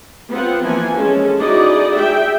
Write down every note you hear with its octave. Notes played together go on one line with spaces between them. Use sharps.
B3 C4 F4 F#5
E3 F3 A#3 G#5
G#3 C#4 A4
D#4 E4 F#4 G#4 D5 D#5
G#4 E5 G5